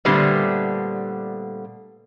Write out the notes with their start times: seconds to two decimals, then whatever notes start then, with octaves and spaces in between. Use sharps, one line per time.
0.05 A#2 D3 G3 A3 B3 C4